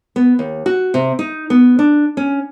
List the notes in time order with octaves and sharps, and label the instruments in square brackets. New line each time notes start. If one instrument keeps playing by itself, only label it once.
[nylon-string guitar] B3
D#2
F#4
C3
D#4
B3
D4
C#4